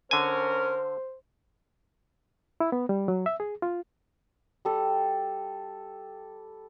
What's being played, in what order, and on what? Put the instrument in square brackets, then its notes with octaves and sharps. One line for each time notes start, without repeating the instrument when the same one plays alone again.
[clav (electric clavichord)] D3 G#5 [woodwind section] C#4 A#4 [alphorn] C5
[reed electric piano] E4
B3
G3
F#3
E5
G#4
F4
[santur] G3 A4